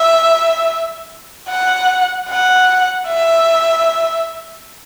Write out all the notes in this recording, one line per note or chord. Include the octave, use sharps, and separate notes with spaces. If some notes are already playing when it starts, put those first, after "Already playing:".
Already playing: E5
F#5
F#5
E5